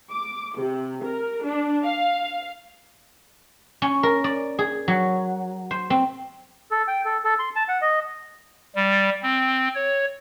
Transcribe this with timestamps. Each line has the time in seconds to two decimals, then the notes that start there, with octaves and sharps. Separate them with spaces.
0.11 D6
0.56 C3
1.03 A#4
1.43 D4
1.83 F5
3.82 C#4
4.03 A#4
4.24 D5
4.59 G#4
4.88 F#3
5.71 C5
5.90 C4
6.71 A4
6.88 G5
7.05 A4
7.24 A4
7.39 C6
7.56 A5
7.68 F#5
7.82 D#5
8.76 G3
9.23 C4
9.75 C#5